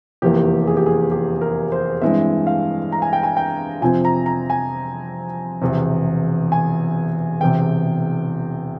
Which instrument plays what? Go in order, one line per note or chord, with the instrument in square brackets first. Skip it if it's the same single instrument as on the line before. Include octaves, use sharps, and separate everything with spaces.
[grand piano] F1 E2 E3 A#3 G4
G#4
G4
G#4
G4
A#4
C5
G2 E3 G#3 C4 E5
F5
A#5
G#5
G5
G#5
G5
F2 C3 F3 C4 G#5
A#5
A#5
G#5
E1 E2 C3
G#5
E1 E2 C3 G5